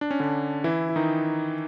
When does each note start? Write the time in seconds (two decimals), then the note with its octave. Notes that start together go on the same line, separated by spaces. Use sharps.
0.01 D4
0.11 C#4
0.20 D3 D4
0.64 E3 E4
0.89 E4
0.96 D#3 D#4